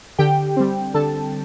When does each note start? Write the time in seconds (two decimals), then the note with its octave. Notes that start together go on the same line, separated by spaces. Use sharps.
0.19 D3 G4 G5
0.57 G3 C4
0.94 D3 A4 A5